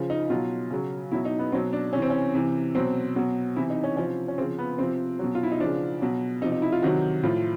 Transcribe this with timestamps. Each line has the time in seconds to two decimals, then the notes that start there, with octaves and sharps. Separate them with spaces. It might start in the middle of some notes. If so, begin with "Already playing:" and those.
Already playing: C#3 F3
0.10 D#4
0.30 B2 F#3 F4
0.71 C#3 F#3
1.12 B2 F#3 E4
1.25 D#4
1.39 B3
1.52 B2 F#3 C4
1.73 D4
1.93 C3 E3 C#4
2.02 C4
2.10 C#4
2.34 C3 E3
2.75 B2 F#3 C4
3.16 B2 F#3
3.56 C3 E3 E4
3.70 D#4
3.83 C#4
3.97 C3 F3 C#4
4.28 C#4
4.38 C#3 C4
4.42 F3
4.58 B3
4.79 C3 F3 C4
5.19 B2 F#3
5.35 F4
5.43 E4
5.52 D#4
5.60 C#3 F3 D4
6.01 B2 F#3
6.42 C3 F3 D#4
6.52 D#4
6.62 E4
6.72 F4
6.82 C3 D#3 F#3 F#4
7.23 A2 F3 F4